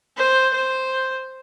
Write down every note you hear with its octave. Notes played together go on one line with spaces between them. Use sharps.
C5
C5